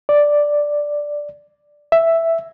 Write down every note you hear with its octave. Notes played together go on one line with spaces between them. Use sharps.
D5
E5